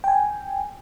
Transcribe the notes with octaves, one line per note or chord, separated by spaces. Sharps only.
G5 G#5